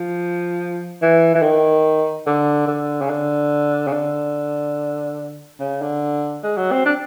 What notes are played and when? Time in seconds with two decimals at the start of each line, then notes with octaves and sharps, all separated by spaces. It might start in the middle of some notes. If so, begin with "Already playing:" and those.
Already playing: F3
1.02 E3
1.35 E3
1.42 D#3
2.26 D3
2.68 D3
3.01 C#3
3.10 D3
3.87 C#3
3.93 D3
5.60 C#3
5.81 D3
6.43 G#3
6.57 F#3
6.72 C4
6.85 D4